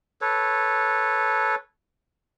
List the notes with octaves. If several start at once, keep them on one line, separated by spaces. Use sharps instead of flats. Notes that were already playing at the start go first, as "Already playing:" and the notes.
A4 B4 C#5